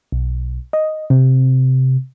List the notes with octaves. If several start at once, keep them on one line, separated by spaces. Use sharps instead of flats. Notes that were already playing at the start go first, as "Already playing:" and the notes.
B1
D#5
C3